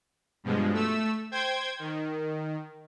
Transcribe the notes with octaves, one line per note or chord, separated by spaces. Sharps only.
G2 B2 F3 G#3
A3 E6
C5 G5 G#6
D#3